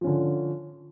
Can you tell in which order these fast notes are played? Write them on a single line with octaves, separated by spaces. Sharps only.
F3 C#4 D3